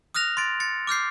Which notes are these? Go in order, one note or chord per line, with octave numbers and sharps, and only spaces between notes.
D#6 F6 F#6 A#6 F7
C6 A6 D7
A6 C#7
D6 F6 G6 C7